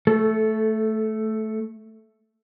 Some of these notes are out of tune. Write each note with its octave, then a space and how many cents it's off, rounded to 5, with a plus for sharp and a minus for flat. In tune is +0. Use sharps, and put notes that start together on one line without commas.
A3 +0 A4 -20